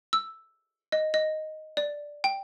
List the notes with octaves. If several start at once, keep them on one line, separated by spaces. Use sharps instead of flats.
E6
D#5
D#5
D5
G5